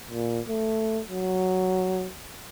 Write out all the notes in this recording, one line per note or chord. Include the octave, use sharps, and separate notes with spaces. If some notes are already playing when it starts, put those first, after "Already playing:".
A#2
A3
F#3